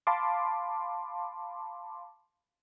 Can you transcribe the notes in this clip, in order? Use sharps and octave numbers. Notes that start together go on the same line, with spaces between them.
F5 A5 B5 C6 D6